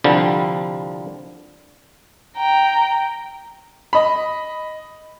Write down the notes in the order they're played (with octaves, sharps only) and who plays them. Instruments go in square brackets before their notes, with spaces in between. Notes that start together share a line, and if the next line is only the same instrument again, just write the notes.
[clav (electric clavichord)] C2 D3 F3 G3
[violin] G5 A#5
[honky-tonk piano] D#5 B5